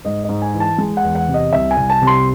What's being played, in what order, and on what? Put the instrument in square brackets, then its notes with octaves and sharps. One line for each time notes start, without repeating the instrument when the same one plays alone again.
[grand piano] G#2 D#5
D#5
G#2
G#5
E3
A5
G#3
F#5
E2
F#5
C3
D#5
C2 E5
G#5
C2
A5
C3
C6